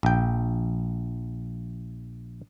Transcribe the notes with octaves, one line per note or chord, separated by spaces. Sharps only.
A#1 G5